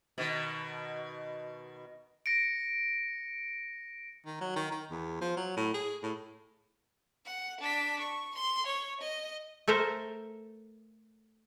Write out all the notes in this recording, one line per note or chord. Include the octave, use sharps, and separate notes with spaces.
B2 D#3
A#6 C#7 D7
D#3
F#3
D#3
D#3
E2
F3
F#3
A2
G#4
A2
F#5
D4 B6
C#6
C6
C#5
D#5
A3 A4 A#4 C5 E5